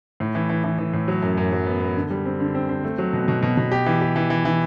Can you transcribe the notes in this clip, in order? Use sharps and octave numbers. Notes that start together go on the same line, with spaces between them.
A2
E3
E3
E3
E3
A2
F#3
F#2
F#2
F#3
B3
B3
D3
G3
C4
D3
C4
C4
A3
F#3
B2
B2
B2
B2
G4
E3
G4
E3
E3
E3